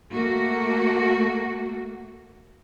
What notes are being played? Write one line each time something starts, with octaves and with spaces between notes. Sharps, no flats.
A3 A#3 F#4